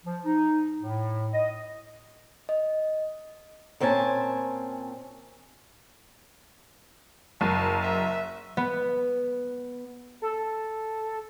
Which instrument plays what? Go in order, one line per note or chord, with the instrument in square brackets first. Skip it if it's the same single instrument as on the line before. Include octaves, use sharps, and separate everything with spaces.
[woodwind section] F3
D#4
A2
D#5
[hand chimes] D#5
[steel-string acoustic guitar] A#2 C4 C#4 G#5 A5
[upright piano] F#1 [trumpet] A5
[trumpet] E5
[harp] B3
[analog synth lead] A4